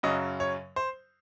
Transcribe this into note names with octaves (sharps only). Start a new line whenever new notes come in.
F#2 C#3 F#3 D#5
C#5
C5